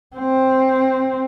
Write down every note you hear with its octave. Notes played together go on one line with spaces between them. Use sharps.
C4